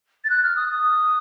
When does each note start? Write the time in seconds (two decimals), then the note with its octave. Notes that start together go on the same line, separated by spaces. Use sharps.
0.24 A6
0.30 F#6
0.43 F6
0.56 D#6
0.69 D#6